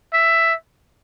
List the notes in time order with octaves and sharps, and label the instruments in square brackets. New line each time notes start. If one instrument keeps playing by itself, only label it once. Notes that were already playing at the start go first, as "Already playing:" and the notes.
[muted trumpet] E5